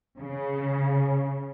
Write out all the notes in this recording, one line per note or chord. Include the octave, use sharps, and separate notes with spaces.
C#3